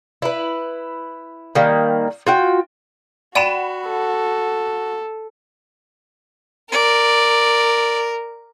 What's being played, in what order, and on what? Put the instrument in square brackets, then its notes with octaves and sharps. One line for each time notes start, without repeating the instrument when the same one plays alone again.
[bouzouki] E4 B4
D#3 G3 A#3
F4 F#4 G5
[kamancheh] F#4 [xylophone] D5 G5 D#7 [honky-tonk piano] F#5 B5 E7
[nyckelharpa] A4
[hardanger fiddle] A#4 [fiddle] D5